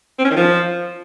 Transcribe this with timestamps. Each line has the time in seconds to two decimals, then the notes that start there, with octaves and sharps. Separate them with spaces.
0.19 C4
0.25 C#4
0.30 D#3
0.36 F3